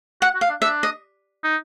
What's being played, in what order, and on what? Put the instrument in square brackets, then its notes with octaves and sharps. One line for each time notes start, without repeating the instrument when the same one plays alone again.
[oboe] F#4 [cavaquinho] F#5
[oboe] F#4
[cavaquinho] F5
[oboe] D4
[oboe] D4 [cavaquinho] E5
[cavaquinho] D#5
[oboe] D#4